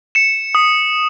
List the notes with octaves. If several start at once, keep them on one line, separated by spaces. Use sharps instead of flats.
C#7 E7
D#6